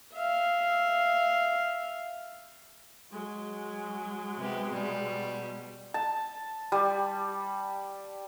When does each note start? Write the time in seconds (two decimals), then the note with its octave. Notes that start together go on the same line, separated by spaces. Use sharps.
0.15 E5 F5
3.12 F#3 G#3
4.37 C3 B3 G4
4.72 B2 G3
5.94 A5
6.72 G3